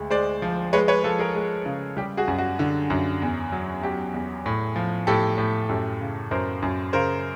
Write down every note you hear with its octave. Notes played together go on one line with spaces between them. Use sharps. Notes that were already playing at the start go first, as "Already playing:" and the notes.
Already playing: D2 G#3
G#3 C5 D5
F3
G#3 B4 C#5
B4 C#5
F3 A4 B4
G#4 A#4
G#3
C#3
G3 G4
F#4 G#4
F#2
F#4
D3
F#2
E2
F#3
F#3 G4
E2
A2
F3
A2 G4 A4
A2
F#2 G4 A4
C#3
F#2 A#4 C5
F#2
C#3 A#4 C5